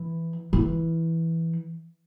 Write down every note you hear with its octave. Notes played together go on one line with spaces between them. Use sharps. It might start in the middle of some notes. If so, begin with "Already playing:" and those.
Already playing: E3
E3